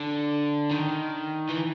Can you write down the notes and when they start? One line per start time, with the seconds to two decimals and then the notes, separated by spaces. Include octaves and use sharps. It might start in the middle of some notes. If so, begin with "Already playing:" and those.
Already playing: D3
0.71 D#3
1.49 E3